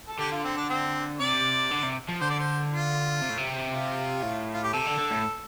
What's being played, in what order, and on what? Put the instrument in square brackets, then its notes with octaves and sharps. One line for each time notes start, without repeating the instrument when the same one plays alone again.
[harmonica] A4
[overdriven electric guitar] D3 [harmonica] G4
[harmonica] F4
C4
D4
C4
[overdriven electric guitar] C3 [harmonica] D5
[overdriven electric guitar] D3
C3
F3
[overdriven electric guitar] D3 [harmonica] C5
[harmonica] D5
C5
F4
[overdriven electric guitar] C3
A2
C3
[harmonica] F4
[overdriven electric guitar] A2
[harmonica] F4
G4
[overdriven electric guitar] C3 [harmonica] A4
[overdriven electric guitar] D3
D3
A2